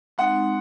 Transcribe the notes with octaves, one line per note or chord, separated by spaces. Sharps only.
G#3 C4 D#4 F#5